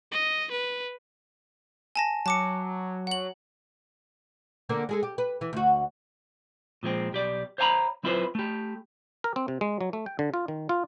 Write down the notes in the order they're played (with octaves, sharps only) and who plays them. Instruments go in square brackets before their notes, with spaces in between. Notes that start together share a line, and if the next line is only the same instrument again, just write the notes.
[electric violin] D#5
B4
[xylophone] G#5 A5 A#6
[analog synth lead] F#3 [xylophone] A5 D6 C#7
[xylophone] F#5 F#7
[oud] D3 A#3 C4
G#3 G#4 A4
G4
B4
E3
D2 F#4
[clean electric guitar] A#2 F3 G#3 C4
B1 G4 D5
C5 C#5 F5 G#5 A#5 B5
F#3 C4 E4 F4 B4 C5
A3 G4
[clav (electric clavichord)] A#4
C4
C3
G#3
F#3
A3
G5
D3
F4
D#3
F4